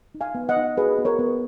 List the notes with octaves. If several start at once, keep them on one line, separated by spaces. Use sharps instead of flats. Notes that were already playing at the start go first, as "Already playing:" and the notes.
D#4
F5 G#5
B3
D#5 F#5
D#4
F#4 G#4 B4
B3
A#4 C#5
B3